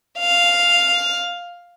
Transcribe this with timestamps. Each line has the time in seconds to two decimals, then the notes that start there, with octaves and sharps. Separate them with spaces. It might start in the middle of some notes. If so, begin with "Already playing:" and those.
0.19 F5